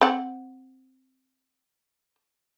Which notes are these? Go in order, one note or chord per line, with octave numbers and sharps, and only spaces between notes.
C4 F#5